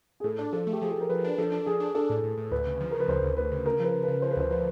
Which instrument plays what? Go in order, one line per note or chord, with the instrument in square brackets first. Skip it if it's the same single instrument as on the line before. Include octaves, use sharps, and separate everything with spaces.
[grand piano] G#4
[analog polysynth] A2 [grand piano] A4
[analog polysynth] D4
[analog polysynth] F3 [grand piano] A4
[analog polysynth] A3
[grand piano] G4
[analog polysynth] F3 [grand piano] G#4
[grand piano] A4
[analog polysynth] F3
[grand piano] A#4
[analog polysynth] F3 [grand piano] B4
[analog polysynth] D4
[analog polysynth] F3 [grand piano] A4
[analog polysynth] D4
[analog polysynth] F3 [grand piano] G#4
[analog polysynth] D4
[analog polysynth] D4 [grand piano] A4
[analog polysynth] A2
A2
A2
[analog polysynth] D2 [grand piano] B4
[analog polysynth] C#3
F3
[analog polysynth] C#3 [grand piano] A#4
[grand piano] B4
[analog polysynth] D2 [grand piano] C5
[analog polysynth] D2
[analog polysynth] D2 [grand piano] B4
[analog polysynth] C#3
[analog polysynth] C#3 [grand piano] A#4
[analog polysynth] F3 [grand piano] B4
[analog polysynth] C#3
[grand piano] B4
[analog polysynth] C#3
[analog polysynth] F3 [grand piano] C5
[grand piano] B4
[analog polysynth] D2 [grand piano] C5
[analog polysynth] F3 [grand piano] B4